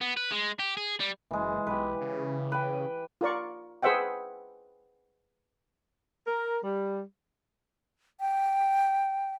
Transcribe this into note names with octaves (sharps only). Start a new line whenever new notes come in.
B3
B4
G#3
G4
G#4
G3
F#1 E3 G#3
B1 G4 B4
C#3
B4 G5
F4 A#4 D5 C#6
G#4 B4 C5 E5 F#5 G5
A#4
G3
G5